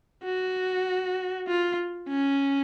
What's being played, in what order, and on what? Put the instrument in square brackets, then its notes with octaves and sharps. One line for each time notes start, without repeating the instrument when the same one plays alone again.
[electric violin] F#4
F4
C#4